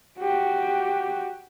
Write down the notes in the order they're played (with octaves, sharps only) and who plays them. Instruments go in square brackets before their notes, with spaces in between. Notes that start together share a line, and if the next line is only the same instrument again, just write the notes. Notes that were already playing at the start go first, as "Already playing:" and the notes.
[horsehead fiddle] F#4 G4